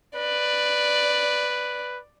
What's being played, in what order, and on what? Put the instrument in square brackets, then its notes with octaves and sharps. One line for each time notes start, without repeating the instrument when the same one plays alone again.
[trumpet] B4 [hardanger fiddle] D5